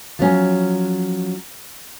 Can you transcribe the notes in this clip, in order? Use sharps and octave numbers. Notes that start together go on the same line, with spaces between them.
F3 F#3 C#4